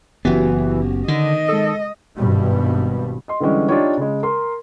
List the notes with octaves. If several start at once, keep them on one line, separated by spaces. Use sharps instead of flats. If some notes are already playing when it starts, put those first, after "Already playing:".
F#1 E3 B3 C#4 F#4 G4
D3 D#3 D#5
G#3 A4 D#6
G#1 G2 B2 G3
D#5 C6
D3 E3 G3 G#3 C#4
D4 D#4 F4 G4 C#5
C#3 G#3
A#4 C6